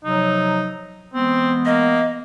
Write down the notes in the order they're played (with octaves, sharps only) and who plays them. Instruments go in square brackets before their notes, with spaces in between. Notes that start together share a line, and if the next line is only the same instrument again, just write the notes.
[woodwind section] C3 F3 F#3 [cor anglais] D#4
[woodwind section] E3 G#3 B3 [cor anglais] C4
[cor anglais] A#3 [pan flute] D#5